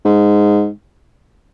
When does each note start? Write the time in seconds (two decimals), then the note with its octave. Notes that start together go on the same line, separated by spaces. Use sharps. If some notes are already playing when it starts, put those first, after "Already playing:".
0.05 G#2